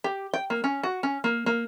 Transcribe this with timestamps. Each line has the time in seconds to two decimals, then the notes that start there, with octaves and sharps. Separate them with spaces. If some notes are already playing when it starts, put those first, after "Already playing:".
0.04 G4
0.34 G5
0.50 A#3
0.64 C#4
0.83 F#4
1.03 C#4
1.24 A#3
1.46 A#3